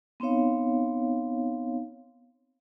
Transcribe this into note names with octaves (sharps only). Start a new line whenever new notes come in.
B3 C4 D#4 C#5 F5